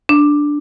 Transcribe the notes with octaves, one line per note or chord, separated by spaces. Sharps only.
D4